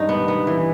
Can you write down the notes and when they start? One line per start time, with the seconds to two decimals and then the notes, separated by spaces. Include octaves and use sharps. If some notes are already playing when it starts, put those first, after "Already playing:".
Already playing: G2 D#3 D#4
0.09 B3
0.28 B3
0.47 E3